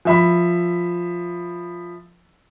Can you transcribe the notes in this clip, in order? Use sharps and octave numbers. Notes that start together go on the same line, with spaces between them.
F3 E5 B5